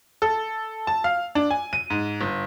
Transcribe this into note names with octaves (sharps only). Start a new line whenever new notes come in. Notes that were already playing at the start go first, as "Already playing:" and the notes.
A4
A5
F5
D4
G#5
D#7
G#2
G1